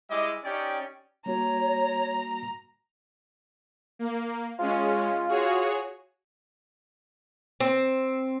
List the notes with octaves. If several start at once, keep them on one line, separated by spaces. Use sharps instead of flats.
G3 G#3 E4 D#5 D6
C#4 D#4 G4 D5 G5
G3 A#3 F#4 C#5 A#5
A#3
G#3 C#4 F4
F#4 G#4 C#5
C4